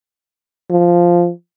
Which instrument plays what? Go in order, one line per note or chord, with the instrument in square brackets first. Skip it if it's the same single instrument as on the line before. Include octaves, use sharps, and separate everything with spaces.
[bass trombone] F3